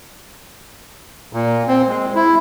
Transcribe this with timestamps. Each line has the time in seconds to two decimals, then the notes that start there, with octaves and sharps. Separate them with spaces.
1.33 A#2
1.68 C4
1.88 G#3
2.15 E4